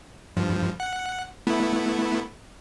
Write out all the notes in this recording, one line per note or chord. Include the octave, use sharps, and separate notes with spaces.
G2 F3
F#5
A3 B3 E4